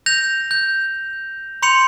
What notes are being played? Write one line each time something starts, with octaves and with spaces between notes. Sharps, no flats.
G6 A#6 F7
G6
B5 C6 G6 C#7 F7